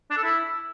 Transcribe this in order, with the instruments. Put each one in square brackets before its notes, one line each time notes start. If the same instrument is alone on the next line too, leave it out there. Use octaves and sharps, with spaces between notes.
[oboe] D4
A4
E4